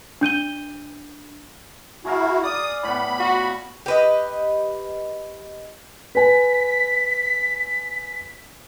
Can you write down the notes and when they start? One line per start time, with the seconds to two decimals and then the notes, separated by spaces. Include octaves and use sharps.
0.21 D4 G6 D#7 G7
2.05 E4 F#4 G#4 A#4 F5
2.43 D5 D#6
2.83 A2 B3 B5
3.19 F4 F#4
3.86 G4 B4 D#5
6.15 B4 G#5 B6